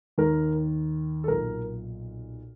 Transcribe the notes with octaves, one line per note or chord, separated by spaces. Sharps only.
D#2 D#3 A#4
A4
B1 A#2 A#4